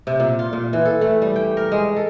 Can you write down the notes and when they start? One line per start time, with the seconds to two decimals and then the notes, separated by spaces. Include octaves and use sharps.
0.07 C3
0.20 A#2
0.39 F4
0.53 A#2
0.73 E3
0.85 A4
1.01 A3
1.22 G3
1.36 G5
1.57 A#4
1.72 G#3
1.96 A4